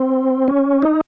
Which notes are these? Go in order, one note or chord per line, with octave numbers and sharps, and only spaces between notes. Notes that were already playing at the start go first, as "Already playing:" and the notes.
Already playing: C4
C#4
D#4